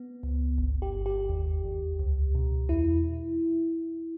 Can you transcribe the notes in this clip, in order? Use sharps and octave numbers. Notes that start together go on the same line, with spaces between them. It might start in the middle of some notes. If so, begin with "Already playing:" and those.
Already playing: B3
C#2
G1
G4
G1
G4
D#2
D#2
C#2
B2
E2 E4